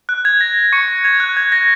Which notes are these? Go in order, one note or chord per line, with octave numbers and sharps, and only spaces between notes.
F#6
G#6
A#6
C#6 C#7
G#6
F#6
G#6
A#6